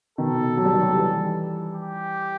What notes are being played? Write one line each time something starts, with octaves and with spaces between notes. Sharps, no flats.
B2 D#3 A4
F#3
G3
D#3 F#3
E3 G3
G4